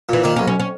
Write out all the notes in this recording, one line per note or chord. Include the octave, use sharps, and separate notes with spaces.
A#2 E3
D#3 A#3
C#4
B1
C#4
C#4